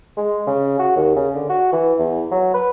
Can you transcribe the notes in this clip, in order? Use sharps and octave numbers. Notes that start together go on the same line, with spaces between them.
G#3
C#3
F#4
D#2
C#3
D3
F#4
E3
E2
F#3
B4